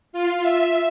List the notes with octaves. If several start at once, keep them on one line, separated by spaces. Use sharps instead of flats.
F4
E5